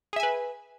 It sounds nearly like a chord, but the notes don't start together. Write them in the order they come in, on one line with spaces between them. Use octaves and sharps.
G#4 E5 G#5 B4